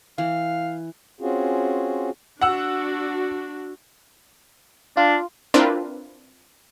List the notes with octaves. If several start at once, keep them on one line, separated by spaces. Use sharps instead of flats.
E3 F5
C4 C#4 F4 F#4 G#4
D4 F#4 F#5 E6
D4 F4
C4 D4 E4 F4 A#4 B4